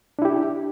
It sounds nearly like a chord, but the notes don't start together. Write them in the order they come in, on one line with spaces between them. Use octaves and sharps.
D4 E4 G4